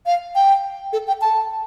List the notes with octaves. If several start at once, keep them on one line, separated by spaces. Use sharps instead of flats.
F5
G5
A4
G5
A5